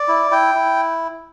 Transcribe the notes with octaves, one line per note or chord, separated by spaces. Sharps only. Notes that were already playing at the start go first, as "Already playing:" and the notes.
Already playing: D5
E4
E4 G5
E4